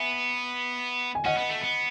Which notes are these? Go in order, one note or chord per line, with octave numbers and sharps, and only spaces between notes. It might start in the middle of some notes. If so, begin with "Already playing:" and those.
Already playing: B3 E5 G#5
G#5
C#4 D#5 F#5
B3
A3
B3